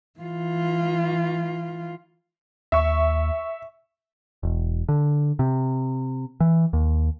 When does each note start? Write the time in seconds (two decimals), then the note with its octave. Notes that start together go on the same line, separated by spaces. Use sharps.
0.20 E3 F4
2.72 D#2 E5 C#6
4.43 E1
4.89 D3
5.39 C3
6.40 E3
6.73 D#2